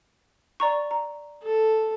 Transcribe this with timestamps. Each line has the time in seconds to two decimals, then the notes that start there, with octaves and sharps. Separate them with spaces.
0.60 D5 A#5 C#6
0.91 A#5
1.43 A4